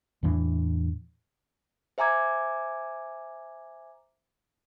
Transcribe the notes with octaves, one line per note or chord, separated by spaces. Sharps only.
E2 A2 E3 D4
C5 E5 G#5 A#5 D6 G#6